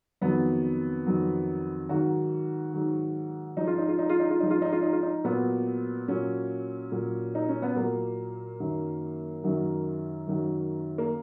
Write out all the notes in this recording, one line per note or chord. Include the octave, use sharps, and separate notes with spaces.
F2 D#3 F#3 B3
F2 D#3 F#3
G#2 D#3 F#3 F#4
G#2 D#3 F#3
G#2 F3 D#4
F4
D#4
F4
D#4
F4
D#4
F4
G#2 F3 D#4
F4
D#4
F4
D#4
F4
D#4
A#2 F#3 B3
A#2 F#3 C#4
A#2 F#3
D#4
C#4
B3
A#2 F#3 A#3
F#2 D#3 F#3
F#2 D#3 F#3
F#2 D#3 F#3
A#3